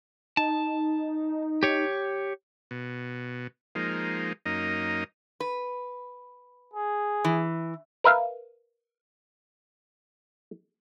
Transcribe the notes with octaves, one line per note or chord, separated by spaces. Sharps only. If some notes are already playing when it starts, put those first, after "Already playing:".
D#4 A5
G4 C#5
B2
F3 G#3 A#3 D#4
F#2 A#3 D#4 D#5
B4
G#4
E3
A#4 B4 E5 F5